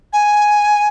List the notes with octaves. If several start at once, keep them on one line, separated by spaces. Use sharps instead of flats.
G#5